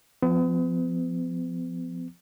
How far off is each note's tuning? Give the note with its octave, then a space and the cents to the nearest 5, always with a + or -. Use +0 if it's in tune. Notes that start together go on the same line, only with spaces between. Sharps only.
F3 +0 B3 +45